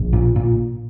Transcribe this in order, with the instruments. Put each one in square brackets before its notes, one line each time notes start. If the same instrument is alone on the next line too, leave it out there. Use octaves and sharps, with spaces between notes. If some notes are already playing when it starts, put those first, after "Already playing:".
Already playing: [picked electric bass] A#1
A#2
A#2